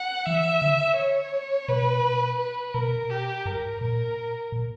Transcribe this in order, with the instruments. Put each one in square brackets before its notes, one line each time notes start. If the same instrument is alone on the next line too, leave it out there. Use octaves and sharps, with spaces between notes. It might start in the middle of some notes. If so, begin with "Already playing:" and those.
Already playing: [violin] F#5
[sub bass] E3 [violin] E5
[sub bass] D3
[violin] C#5
[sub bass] B2 [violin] B4
[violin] B4
[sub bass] B2 [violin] A#4
[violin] G4
[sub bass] G2 [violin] A#4
[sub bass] A#2 [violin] A#4
[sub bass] A#2